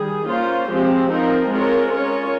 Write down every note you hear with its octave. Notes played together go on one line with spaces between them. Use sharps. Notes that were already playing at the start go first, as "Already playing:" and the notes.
Already playing: D#3 G3 G#4
A#3 C#4 F4 C5
F3 G#3 C4 G4
F3 C4 D#4 A#4
G#3 C4 F4 A#4 C#5
C#4 F4 A#4 C#5